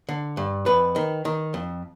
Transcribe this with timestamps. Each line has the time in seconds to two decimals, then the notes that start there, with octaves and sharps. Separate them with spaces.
0.09 D3
0.37 G2
0.66 F2 B4
0.96 D#3
1.25 D#3
1.54 F2